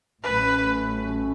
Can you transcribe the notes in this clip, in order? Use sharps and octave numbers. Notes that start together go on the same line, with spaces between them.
A1 A2 F#3 A3 C#4 B4